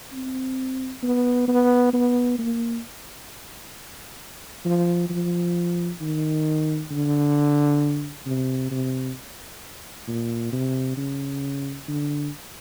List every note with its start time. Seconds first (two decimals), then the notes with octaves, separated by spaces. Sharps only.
0.13 C4
1.03 B3
1.48 B3
1.93 B3
2.38 A#3
4.65 F3
5.10 F3
6.01 D#3
6.91 D3
8.26 C3
8.71 C3
10.08 A#2
10.52 C3
10.97 C#3
11.88 D3